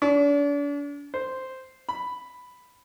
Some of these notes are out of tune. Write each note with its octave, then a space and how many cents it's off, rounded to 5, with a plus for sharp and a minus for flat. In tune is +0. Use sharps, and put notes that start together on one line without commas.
D4 -40
C5 -5
B5 +5